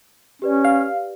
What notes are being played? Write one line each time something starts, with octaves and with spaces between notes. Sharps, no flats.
C#4 G4 B4 D5
F5